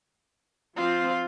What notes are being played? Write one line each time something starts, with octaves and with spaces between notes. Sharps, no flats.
F3 C4 F4